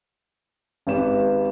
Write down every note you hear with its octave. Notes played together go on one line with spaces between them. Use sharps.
G#1 G4 B4 E7